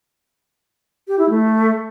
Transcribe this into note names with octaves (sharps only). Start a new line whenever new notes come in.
G4
E4
A3